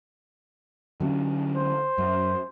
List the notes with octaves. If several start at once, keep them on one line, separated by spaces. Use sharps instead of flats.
D3 F#3 C#4
C5
F#2